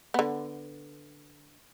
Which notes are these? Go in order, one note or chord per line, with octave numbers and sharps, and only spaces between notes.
D3 B3